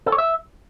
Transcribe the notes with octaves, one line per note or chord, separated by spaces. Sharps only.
A4
C#5
E5